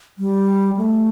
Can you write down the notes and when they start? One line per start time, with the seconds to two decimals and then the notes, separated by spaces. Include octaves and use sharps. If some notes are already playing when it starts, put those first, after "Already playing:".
0.18 G3
0.77 A3